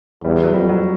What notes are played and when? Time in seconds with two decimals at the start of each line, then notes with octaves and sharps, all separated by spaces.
0.24 E2 G3
0.44 F#3
0.54 F2 G3
0.69 F#3